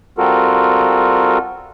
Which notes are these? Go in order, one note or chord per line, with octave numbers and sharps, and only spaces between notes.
G3 C4 F4 F#4 A4 A#4